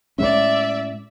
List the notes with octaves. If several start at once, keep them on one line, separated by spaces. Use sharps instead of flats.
A2 G#3 C#4 D5 E5